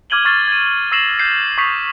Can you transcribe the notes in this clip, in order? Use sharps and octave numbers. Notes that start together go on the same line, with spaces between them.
D6 F6 G#6 D#7 F#7 G7
C#6 F6 A6 C7
G#6 D#7
C#6 E6 A#6 C7 E7 F#7
G6 C7
C#6 D#6 G6 B6 C7 F7